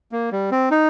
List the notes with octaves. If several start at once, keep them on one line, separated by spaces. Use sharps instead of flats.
A#3
G3
C4
D#4